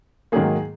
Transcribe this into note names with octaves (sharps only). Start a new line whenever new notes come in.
G#2 D#3 F#3 A#3 G#4